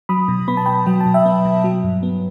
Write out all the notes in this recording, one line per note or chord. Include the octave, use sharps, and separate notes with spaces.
F#3 B5 D#6
B2
B3 B5
A5
B2 G5 B5
F#3 G5
A5
B2
E5 G5
B3
B2
F#3
G2
B3